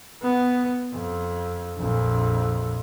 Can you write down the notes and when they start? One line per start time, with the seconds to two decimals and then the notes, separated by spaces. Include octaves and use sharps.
0.23 B3
0.93 F2
1.78 A#1 F2